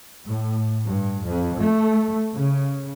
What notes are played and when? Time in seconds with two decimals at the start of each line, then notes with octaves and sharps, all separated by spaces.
0.27 A2
0.87 G2
1.27 F2
1.60 A3
2.35 C#3